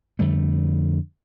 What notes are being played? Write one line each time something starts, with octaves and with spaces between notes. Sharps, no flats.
F2 D3 G3 A3